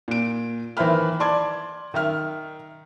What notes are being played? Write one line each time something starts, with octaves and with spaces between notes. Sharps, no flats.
A#2 D7
D#3 E3 C5 E5 B5 F6
D5 A5 C6 D6 G#6
D#3 E5 F6